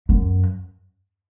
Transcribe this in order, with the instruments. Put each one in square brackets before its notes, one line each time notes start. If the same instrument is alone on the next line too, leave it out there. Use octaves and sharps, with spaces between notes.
[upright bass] F#2